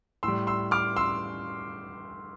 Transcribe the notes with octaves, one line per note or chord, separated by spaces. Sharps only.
A2 G3 C6 E6
C6 E6
D6 F6
C6 E6